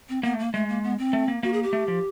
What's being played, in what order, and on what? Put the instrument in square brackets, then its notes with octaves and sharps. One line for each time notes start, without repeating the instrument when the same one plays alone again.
[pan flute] C4
[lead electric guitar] A#3 [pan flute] B3
[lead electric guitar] A3
[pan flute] A#3
[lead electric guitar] G#3 [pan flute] A3
[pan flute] A#3
B3
C4
[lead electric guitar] A3
A#3
[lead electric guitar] A#3 [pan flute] F#4
[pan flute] G#4
G4
[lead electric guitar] A3
F3